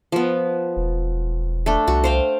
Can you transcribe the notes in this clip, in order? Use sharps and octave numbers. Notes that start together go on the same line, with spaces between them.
F3 B3
E1
A3 D4
C2 F#4
C5 F5 G5